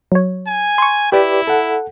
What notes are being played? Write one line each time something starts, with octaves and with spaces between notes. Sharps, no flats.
F#3 C#5
G#5
C6 C#6
E4 G4 B4 D5
A4 F#5